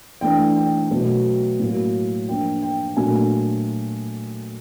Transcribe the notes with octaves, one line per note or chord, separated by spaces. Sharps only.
E3 A3 D4 G5
G5
B2 F#3 A3
A2 F#3 A#3
F3 A#3 D4 G5
G5
A#2 F#3 A3 D4 G#5